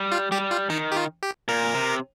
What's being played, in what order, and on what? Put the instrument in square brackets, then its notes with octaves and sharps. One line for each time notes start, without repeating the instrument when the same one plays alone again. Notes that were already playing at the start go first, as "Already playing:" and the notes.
Already playing: [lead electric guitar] G3
[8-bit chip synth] F4
[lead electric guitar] G3 [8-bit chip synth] G4
[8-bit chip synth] F4
[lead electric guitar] D#3 [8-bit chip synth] D#4
[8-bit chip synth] G4
F4
G4
[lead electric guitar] A#2 [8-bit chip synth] A#4
[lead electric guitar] C3